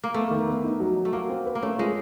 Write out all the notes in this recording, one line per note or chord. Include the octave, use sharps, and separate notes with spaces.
A#3
A3 B3
D#3
B3
D#4
F#3
F#3
A3
A#3 F#4
C4
B4
A#3
A3 C#4
G#3 F4